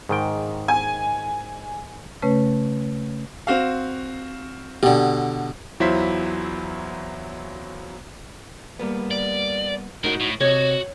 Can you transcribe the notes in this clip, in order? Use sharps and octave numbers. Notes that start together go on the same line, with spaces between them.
G#2 D#3 G5
G#5
C#3 A3 C#4 B4 C#5
C4 F#4 F5
B2 D3 G4
E2 F#3 E4 F4 C5 B6
G3 A#3 B3
D5
A2 D#4 F#4 A#4
A2
C3 F#4 C#5 D#5